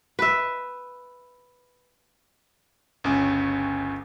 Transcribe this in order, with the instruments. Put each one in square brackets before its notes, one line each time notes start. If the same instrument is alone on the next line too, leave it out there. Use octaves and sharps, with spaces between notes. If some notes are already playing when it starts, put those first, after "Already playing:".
[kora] B4 E5
[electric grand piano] G1 C#2 C#4 G#5